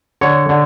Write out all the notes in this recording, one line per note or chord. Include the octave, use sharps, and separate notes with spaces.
D3 C#5
D3